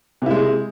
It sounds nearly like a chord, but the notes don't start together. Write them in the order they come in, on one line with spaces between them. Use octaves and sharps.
C3 E4 G#3